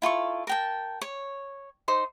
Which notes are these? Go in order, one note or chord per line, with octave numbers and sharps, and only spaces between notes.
E4 F4 A4 C#6
A#4 G5 A5
C#5
D#4 C5 C6